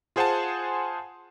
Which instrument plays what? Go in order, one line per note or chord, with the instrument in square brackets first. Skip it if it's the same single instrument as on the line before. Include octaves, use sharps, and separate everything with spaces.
[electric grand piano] F4 G#4 C5 F#5 G#5 A5